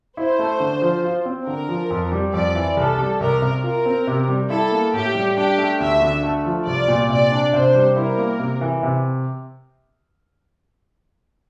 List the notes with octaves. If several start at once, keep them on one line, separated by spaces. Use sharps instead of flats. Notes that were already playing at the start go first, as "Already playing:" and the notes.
E4 C5
A3
D3
F3
F4
C4
D3 A#4
F3
F2
G3
F2 D5
E3
C2 A4
G3
C2 A#4
C3
F4 A#4
C4
C3
G3
E4 A4
A#3
A2 G4
G3
D4 G4
A3
D2 E5
D3
A3
F3
C2 D5
A#2
C3 D5
D4
C3 C5
G3
E4 A#4
A#3
C3
E3
C3